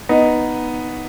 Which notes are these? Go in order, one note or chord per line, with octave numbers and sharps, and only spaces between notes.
B3 D#4